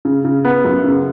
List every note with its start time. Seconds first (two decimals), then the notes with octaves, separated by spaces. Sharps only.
0.05 C#3
0.25 C#3
0.45 B3
0.64 F#2
0.84 C#3